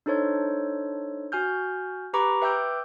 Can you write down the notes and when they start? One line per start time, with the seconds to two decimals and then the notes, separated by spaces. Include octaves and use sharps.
0.06 D4 D#4 A4 C5 C#5
1.32 F#4 G#5 F6 G6
2.13 G4 B4 A#5 B5 C#6 D6
2.42 B4 E5 G5 D6 E6 G6